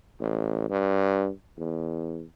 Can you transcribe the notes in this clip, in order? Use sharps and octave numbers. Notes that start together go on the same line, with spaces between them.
A1
G2
E2